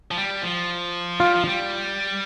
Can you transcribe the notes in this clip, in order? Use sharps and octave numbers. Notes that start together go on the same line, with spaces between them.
F3
G3
F3
G3 F4
F3
G3